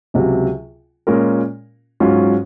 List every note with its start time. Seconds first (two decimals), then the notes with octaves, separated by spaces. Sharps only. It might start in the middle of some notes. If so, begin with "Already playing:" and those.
0.14 C#2 C3 F#3
1.07 A#2 G#3 C#4 F4 A#4
2.00 G#2 F#3 C#4 F4